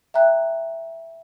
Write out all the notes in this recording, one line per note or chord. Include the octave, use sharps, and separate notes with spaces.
E5 G5 A#5 F#6